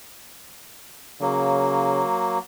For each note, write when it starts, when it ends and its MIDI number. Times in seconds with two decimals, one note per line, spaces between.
1.21 2.02 49
1.21 2.38 54
1.21 2.38 58